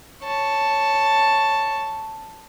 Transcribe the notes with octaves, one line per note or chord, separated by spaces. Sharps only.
C#5 A5